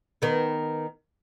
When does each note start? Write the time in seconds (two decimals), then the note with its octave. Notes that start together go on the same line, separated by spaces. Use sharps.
0.22 D#3 B3